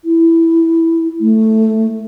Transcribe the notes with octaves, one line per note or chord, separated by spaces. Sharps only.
E4
A3